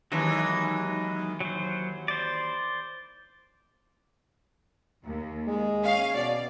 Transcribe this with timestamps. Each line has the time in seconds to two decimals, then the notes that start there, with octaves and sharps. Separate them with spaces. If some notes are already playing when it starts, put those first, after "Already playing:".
0.12 D#2 E3 F#3 G#3 D#4
1.40 F#3 C5
2.08 C5 D5
5.03 D#2
5.48 G#3
5.82 C#4 F5
6.15 B2 D5